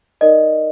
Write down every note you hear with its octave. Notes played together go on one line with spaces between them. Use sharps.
D#4 A#4 D5 D#5